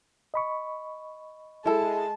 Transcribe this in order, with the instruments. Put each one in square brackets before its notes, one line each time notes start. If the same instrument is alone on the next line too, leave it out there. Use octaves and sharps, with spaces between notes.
[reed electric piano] D#5 B5 C#6
[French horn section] G#3 G#4 [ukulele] E4 A4 [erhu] A5